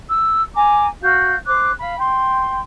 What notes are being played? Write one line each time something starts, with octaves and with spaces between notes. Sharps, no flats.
E6
G#5 A#5 D6
F#4 F5 G6
C5 D6 F#6
F5 B5
G5 C6